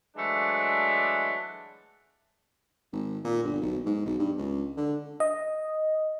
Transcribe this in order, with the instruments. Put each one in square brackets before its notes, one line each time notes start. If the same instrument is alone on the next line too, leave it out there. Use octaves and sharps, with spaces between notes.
[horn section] E3 F#3 G#3 A3 D4
[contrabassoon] G#1
A#2
G1
B1
G#2
B1
G2
C#2
D3
[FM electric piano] D#5